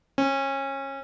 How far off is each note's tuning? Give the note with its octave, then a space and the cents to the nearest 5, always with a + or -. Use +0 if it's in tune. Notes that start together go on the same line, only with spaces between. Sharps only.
C#4 -25